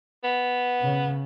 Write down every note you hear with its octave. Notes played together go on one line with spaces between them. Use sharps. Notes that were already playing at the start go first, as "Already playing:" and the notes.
B3
C#3